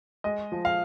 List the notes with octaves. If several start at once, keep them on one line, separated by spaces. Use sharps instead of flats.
G#3 D#5
F3
F5